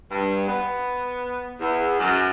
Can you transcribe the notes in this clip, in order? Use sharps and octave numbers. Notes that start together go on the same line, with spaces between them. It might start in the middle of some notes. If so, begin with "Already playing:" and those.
G2
B3
E2
F#2